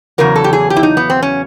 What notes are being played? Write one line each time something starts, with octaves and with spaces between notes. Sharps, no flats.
E2 C#3 F#3 A#4
A4
G4
G#4
G4
E4
D#4
B3
C4
C#4